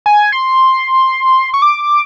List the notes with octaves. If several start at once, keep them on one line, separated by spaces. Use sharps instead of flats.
G#5
C6
C#6
D6